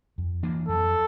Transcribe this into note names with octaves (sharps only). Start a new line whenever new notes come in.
F2
E3 A#3 D4
F2 A4